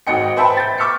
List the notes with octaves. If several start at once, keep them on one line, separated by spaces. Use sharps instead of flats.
G#1 G#2 F#4 D#5 G5 C#7
B4 C5 E5 G5 A5 B5
G6 A6
C#6 D6 E6 F6 B6 C#7